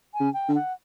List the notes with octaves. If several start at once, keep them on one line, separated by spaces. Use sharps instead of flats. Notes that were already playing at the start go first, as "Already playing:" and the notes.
G#5
C#3
G5
D3
F#5